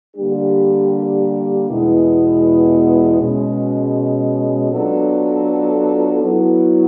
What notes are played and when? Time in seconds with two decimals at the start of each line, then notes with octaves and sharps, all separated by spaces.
0.16 D3 G3 A#3 D4 G4
1.68 E2 B2 G#3 B3 E4
3.20 B2 G#3 C#4
4.71 F#3 B3 D4 F4 A4
6.22 F#3 B3 E4